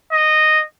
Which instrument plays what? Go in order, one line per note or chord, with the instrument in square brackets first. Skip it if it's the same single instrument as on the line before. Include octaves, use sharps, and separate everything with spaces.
[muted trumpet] D#5